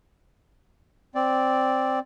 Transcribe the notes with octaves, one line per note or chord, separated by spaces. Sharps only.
C4 D5